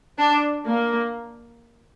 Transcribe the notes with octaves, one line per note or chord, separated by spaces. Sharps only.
D4
A#3